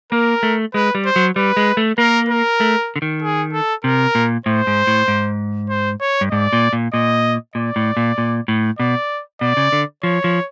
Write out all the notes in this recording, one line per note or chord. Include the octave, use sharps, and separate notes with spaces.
A#3 A#4
A3
G#3 B4
G3
C5
F#3
G3 B4
G#3
A3
A#3 A#4
A#4
A3
D3
D#3
G#4
A4
C3 A#4
A#2
A2 C5
G#2
A2
G#2
C5
C#5
G2
G#2 D5
A#2
A#2
A#2 D#5
A#2 D5
A2
A#2
A#2
A2
B2 D5
B2 D5
C#3
D3
F3 C#5
F3